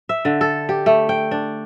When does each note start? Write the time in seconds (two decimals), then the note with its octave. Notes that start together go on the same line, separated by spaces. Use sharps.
0.09 E5
0.25 D3
0.41 A4
0.69 G4
0.86 A3
1.09 G5
1.31 D4